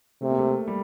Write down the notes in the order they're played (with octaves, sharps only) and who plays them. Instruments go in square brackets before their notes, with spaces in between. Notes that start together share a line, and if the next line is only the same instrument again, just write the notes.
[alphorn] C3 [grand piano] A3
[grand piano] A#3
A3
G3